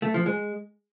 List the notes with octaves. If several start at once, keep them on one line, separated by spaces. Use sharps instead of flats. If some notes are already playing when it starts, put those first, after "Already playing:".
A3
F3
G#3